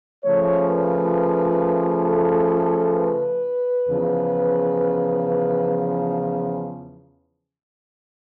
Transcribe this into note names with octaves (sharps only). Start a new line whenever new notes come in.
C#3 F3 A3 C#5
B4
A4
B4
E2 C#3 F3